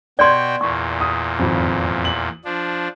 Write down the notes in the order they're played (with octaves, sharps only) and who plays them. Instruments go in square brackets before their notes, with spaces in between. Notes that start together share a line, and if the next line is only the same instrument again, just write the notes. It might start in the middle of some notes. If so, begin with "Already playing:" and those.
[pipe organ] B2 F#4 G5 [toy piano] D5 C6 [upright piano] G6 G#6
[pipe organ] E2 A#2 [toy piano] C#6
[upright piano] D#6
G#1 F2
F#7
[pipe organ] F3 D4